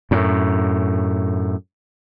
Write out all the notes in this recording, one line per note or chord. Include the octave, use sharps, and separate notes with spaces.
F#2 A2